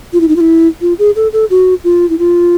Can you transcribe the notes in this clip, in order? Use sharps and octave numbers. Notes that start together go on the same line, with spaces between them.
F4
E4
D#4
F4
E4
F4
G#4
A4
A4
F#4
F4
E4
F4